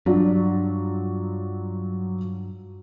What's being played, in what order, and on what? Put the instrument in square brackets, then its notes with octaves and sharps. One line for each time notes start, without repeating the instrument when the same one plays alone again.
[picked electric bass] G2 [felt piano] F#3 D4 F4